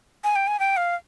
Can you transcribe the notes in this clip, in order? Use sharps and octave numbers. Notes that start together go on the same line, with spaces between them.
G#5
G5
G#5
G5
F5